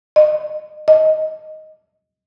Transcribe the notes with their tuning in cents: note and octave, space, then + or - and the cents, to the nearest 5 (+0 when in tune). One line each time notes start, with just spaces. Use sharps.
D#5 -30
D#5 +5